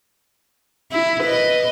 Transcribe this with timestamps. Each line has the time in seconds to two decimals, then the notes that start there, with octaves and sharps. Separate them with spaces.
0.92 E4
1.24 B4 D#5